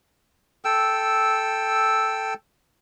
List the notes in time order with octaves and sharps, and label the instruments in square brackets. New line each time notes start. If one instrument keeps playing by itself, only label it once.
[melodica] A4 G5 E6